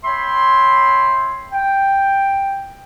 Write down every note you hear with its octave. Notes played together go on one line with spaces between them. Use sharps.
C#5 E5 G5 B5 C6
G5